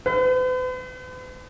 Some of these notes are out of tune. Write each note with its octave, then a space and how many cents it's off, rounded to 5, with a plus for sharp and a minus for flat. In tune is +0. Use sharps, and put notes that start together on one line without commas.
B4 +45